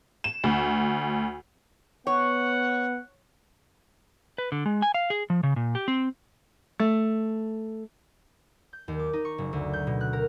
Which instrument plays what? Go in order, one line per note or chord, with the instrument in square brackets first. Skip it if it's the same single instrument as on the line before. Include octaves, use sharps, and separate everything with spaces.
[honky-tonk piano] E7
D2
[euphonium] B3 [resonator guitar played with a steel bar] C#5 [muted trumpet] F#5
[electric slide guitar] B4
D3
G#3
G#5
F5
G#4
F3
C#3
A#2
G4
C4
[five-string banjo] A3
[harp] G6
D#2
D6
D#4
C#6
F#1
D2
G6
B2
F#6
A#4